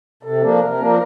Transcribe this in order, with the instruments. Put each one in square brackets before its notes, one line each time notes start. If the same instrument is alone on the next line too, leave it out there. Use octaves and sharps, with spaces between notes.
[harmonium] C3 [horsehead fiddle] A4
[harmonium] F3 A#3 D4
[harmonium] C3 [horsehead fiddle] A#4
[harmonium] F3 A#3 D4